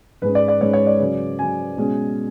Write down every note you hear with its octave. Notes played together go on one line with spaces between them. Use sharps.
G#2 G#3 C#4 B4
D5
D5
G#2 G#3 C#4 C#5
C#5
D5
C#3 F#3 C#4
C#3 F#3 C#4 G#5
B2 G#3 C#4